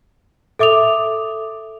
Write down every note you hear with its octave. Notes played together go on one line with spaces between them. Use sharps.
A4 E5 D6 D#6 F7